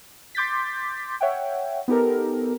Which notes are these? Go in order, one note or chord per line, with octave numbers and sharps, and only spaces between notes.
C6 D6 G6 A6 B6
C#5 E5 F#5 G5
B3 D#4 G4 A4 A#4